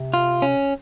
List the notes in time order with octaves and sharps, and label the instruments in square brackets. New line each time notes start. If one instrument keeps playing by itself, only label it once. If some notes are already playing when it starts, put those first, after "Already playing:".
Already playing: [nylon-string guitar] C3
[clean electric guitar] F4
C#4